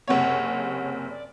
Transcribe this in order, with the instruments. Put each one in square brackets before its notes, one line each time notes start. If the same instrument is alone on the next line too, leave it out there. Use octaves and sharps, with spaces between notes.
[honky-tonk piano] F#1 C3 C#5 [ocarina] F#5
[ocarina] D5